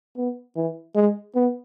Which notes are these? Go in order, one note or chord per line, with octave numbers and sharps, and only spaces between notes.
B3
E3
G#3
B3